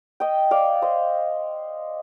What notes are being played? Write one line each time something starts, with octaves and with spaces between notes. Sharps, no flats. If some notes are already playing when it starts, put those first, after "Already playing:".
D#5 G5
D5 F5
C5 D#5